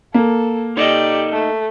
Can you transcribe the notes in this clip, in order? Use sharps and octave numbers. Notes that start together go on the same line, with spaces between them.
A#3 A4
D#4 G4 A4 D5 D#5
A3